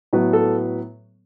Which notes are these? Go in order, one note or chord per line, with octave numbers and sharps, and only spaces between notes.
A2 F#3 B3 B4
A4